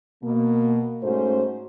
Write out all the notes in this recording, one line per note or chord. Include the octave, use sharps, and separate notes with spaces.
B2 A#3
G#2 A3 C#4 F#4 C5